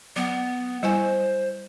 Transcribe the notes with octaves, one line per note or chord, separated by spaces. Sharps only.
F#3 B3
G3 E4 C5 G#5